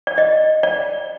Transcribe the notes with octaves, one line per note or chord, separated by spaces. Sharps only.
D5
D#5
D5